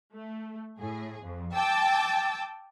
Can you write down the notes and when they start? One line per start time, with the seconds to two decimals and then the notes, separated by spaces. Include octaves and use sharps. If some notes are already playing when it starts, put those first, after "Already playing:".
0.15 A3
0.78 A2 G#4
1.23 F2
1.54 G5 A5 D6 E6